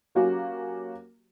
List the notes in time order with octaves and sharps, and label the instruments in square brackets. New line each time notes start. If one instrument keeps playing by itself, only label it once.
[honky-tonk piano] F#3 A#3 C#4 F#4 G4